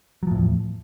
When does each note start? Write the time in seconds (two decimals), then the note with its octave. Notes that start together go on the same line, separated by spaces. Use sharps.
0.23 F#3
0.27 F3
0.31 A2
0.36 E2